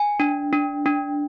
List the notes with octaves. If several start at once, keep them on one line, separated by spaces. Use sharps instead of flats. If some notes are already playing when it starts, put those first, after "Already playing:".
Already playing: G#5
D4
D4
D4